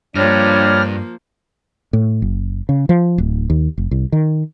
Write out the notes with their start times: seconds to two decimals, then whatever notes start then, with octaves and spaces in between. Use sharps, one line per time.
0.15 G2 F3 G3 A#3 D4 C#5 F6 A#6
1.93 A2
2.22 F#1
2.69 C#3
2.89 F3
3.18 D1
3.50 D#2
3.78 F1
3.91 C2
4.12 D#3